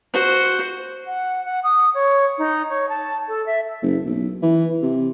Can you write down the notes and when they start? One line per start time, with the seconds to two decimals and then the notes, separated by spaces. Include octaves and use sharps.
0.14 F#4 C5
1.07 F#5
1.45 F#5
1.64 D#6
1.94 C#5
2.38 D#4
2.70 C#5
2.89 A5
3.28 A4
3.46 E5
3.83 F#1
4.06 B1
4.43 E3
4.82 C3